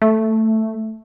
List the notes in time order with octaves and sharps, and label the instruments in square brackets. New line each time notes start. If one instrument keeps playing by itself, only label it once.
[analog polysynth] A3